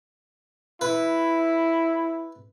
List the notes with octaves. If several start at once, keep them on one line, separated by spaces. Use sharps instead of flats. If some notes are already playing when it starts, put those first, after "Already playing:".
E4 B4